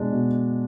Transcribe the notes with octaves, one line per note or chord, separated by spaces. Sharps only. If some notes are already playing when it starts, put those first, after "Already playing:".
Already playing: B2 G#3 D4
B2